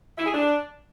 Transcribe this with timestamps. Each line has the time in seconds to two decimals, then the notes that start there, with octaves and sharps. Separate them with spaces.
0.18 E4
0.26 G#4
0.34 D4